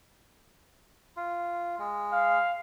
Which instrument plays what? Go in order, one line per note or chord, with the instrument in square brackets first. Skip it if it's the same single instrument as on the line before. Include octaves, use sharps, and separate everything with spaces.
[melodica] F4
G#3
[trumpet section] F5